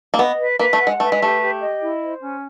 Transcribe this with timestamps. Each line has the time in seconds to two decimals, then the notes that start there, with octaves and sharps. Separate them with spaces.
0.14 A#3
0.19 B3 D#5
0.39 B4
0.59 A#3 B4
0.73 A3
0.79 F#5
0.87 G#3
1.00 A3 B4
1.12 G#3
1.21 A3 G4
1.41 G4
1.61 D#5
1.81 E4
2.02 C5
2.22 C#4